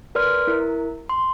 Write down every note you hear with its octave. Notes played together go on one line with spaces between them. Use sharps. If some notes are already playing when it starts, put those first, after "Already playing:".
A#4 B4 D5 C6 F6
E4 A#4
C6